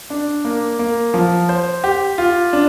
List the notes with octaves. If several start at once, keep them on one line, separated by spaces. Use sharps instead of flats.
D4
A#3
A#3
F3
C5
G4
F4
D4